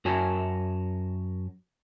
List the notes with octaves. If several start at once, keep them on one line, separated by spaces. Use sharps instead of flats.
F#2 F#4 A#4 C#5 G#5 A5